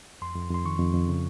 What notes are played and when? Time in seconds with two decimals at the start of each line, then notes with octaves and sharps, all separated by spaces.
0.22 F2 C6
0.36 F2
0.50 F2 C6
0.65 D#3 C#6
0.79 F2
0.94 F2
1.09 C#3